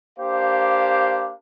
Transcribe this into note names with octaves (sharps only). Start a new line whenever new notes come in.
A#3 D4 G4 C5 F5